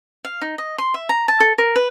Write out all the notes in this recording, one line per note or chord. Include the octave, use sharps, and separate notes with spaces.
F5
D#4
D#5
C6
E5
A#5
A5
A4
A#4
B4